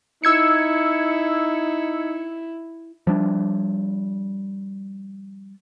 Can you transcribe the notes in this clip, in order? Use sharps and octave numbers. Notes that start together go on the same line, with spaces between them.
D#4 E4 E6 G#6 C#7
F3 G3 D4